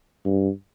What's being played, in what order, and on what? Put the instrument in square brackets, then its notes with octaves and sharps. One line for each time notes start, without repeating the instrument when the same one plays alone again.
[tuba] G2